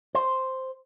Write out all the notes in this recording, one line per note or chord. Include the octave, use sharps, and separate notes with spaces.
C5